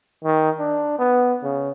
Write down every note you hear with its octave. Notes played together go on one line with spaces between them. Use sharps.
D#3
D4
B3
C#3